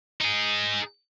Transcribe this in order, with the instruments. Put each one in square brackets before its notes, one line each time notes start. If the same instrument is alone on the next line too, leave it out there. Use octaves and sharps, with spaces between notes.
[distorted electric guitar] D#4 G#4